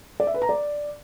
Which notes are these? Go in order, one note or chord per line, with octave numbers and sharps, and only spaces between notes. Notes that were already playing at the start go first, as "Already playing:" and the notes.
D5
E5
B4
A#5
D5